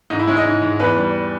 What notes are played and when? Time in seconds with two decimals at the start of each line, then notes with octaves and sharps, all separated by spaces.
0.10 G#2 D#4
0.19 E4
0.27 G#3 C#5
0.37 D#5
0.45 G#2
0.62 G#2
0.79 E2 B4
0.97 G3